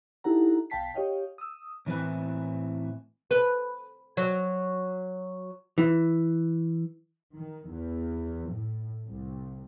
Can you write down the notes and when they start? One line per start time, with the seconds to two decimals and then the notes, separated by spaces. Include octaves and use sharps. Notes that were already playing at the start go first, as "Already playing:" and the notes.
0.24 D#4 E4 G4 A4 F#5 A#5
0.70 B1 F5 G5 A5 B6 C7
0.94 G4 C#5 D#5 F5 G5
1.38 D#6 E6
1.86 A2 E3 C4 E4 B4 G#5
3.31 B4
4.17 F#3
5.78 E3
7.35 D#3
7.69 E2
8.51 A2
9.07 C2